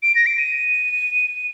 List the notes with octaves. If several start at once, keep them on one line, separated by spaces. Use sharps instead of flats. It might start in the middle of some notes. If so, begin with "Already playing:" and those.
D7
A#6
D7
D#7